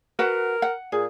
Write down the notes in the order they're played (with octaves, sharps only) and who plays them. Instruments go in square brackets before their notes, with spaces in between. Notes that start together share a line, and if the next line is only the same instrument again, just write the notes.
[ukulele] F#4 B4 F#5 [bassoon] A#4
[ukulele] F#5
[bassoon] A#2 [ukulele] G#4